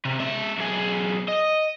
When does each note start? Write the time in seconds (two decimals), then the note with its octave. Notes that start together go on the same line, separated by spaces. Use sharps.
0.05 C3
0.20 G#3 E5
0.59 B1 G#4
1.28 D#5